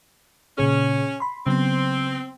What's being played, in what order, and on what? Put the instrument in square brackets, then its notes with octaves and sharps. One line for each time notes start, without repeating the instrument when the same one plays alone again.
[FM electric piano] A#2 C#3 G#4 [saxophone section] C#4
[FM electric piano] B5 C6
[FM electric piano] C#3 F#3 B3 [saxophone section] C4